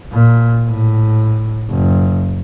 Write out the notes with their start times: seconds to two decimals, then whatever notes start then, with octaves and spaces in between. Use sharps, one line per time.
0.12 A#2
0.68 A2
1.70 F#1